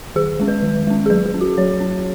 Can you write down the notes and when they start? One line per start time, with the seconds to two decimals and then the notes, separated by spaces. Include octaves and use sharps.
0.16 D#3 G#4
0.40 G#3 C#4
0.48 B4
0.63 D#3
0.87 G#3 C#4
1.06 G#4
1.10 F#3 B4
1.26 G#4
1.34 C#4
1.41 F#4
1.58 F#3 C#5
1.80 C#4